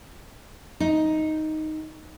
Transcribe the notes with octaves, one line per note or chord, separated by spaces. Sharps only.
D#4